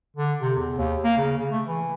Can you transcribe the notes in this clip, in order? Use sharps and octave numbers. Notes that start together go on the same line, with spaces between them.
D3
C3
E2
D#2
A#3
C#3
C#3
A3
E3